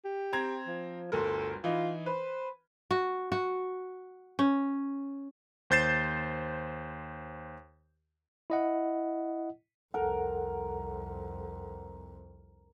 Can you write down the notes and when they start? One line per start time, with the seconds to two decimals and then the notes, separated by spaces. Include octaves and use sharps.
0.04 G4
0.33 C4 A#5 G#6
0.67 F3
1.12 G1 D2 A4 A#4
1.64 E3 D#4 F4
2.06 B4 C5
2.91 F#4
3.32 F#4
4.39 C#4
5.70 D#2 C5 G6 A6 C7 E7
8.50 E4 D#5 F#5
9.94 C2 F2 A4 A#4 F#5